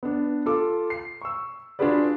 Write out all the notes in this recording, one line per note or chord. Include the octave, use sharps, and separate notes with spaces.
B3 D4
F4 A4 D6
C7
C#6 E6
D4 F4 F#4 G#4 B4 D5